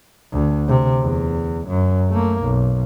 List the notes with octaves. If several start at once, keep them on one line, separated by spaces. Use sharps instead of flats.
D2
C3
E2
F#2
A3 A#3
B1